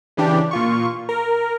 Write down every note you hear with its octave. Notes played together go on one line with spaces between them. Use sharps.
C#3 E3 D4 G4
A#2 F4 C#6
A#4